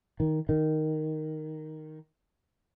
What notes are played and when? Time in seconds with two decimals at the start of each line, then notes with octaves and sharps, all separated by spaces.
0.20 D#3
0.49 D#3